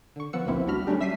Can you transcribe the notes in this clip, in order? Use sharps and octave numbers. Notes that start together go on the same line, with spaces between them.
D3 C#6
F3 B3 F#5 E6 C#7
A1 D2 A#2 A#3 C4 E4
D2 G3 D4 F#4 B5 F6
F#3 G3 A3 C#4 D4 G4
E5 E6 B6 C7 D#7